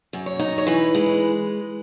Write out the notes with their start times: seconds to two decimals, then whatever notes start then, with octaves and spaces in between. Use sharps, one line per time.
0.13 F#2
0.26 C#5
0.39 D#4
0.58 C#5
0.67 E3 B4
0.95 G#3